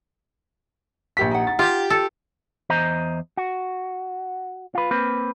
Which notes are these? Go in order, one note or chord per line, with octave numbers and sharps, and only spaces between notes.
A#1 G4 B6
D#4 F#5
A6
F4 G4
A4
E2 C5 D#5 A#5
F#4
F4 B4
A#3 C4 B4